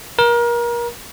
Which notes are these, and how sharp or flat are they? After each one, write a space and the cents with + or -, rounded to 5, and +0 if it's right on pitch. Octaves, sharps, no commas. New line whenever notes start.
A#4 +30